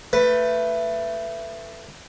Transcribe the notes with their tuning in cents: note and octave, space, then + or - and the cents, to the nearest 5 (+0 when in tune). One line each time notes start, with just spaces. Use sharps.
A3 +20 B4 +0